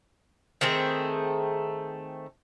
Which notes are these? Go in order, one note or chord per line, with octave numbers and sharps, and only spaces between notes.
D#3 A3 C4 G#4